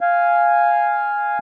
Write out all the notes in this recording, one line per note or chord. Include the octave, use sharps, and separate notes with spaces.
F5 G#5